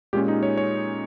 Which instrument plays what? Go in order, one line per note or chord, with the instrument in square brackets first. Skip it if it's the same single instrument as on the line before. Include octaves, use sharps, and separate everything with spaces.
[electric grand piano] A#2 G#3 C#4 G4
D#4
C#5
C#5